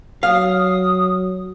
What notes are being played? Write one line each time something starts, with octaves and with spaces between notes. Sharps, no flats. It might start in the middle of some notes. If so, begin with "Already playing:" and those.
F#3 F5 D#6